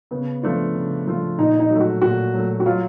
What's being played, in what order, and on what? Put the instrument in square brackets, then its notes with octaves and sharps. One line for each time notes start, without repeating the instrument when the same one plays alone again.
[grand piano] C#3 [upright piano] B3
[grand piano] F3 A3 D4 F4
C#3
F3 A3 D4 F4
[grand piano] A#2 [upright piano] D#4
[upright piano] D#4
[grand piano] F#3 A3
[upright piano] F#4
[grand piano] A#2 [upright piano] F#4
[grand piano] F#3 A3
[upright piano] F#4
[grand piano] F#3 [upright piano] F4